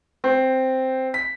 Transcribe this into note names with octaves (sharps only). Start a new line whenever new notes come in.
C4
B6